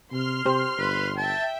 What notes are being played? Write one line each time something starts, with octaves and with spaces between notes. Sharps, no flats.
C3 C6 F6
C3 G4 C5
G1 B4
E5 G5 A5